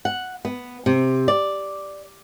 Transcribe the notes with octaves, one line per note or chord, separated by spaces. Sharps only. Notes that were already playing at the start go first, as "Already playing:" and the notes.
F#5
B3
C3
D5